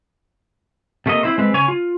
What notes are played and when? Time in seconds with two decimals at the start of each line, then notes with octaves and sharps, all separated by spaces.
1.06 C3 A3 A#3 D#5
1.23 C4 E4 C5
1.38 G#3 C4 B4
1.54 C#3 C#5 G#5
1.68 F4